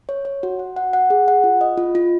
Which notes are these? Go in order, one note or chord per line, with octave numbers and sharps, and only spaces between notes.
C#5
C#5
F#4
F#5
F#5
F#5
G#4
F#5
F4
D#5
F4
F4